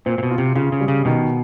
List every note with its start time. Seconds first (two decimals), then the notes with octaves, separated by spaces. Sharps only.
0.06 A#2 C4
0.18 A#2
0.23 B2
0.31 F4
0.38 C3
0.55 C#3 F4
0.72 C#3
0.81 G3
0.88 C#3
1.05 B2 D#3